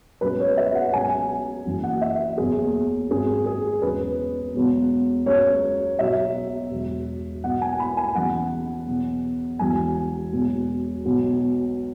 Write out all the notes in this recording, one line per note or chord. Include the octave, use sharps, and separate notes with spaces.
C#2 B2 F#3 B4
C#5
E5
F#5
C#2 B2 F#3 G#5
F#1 F#2 E3
F#5
E5
F#1 E2 B2 F#3 G#4
G#1 F#2 C#3 G#4
G#4
E1 E2 C#3 F#3 B4
E1 E2 B2 F#3
C#2 C#3 F#3 C#5
B1 B2 F#3 E5
E1 E2 B2 F#3
B1 B2 F#3 F#5
G#5
B5
G#5
E2 C#3 E3 F#5
E2 B2 F#3
E1 E2 E3 G#5
E1 E2 B2 F#3
B1 B2 F#3